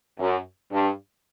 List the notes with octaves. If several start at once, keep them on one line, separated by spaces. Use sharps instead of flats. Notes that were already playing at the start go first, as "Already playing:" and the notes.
F#2
G2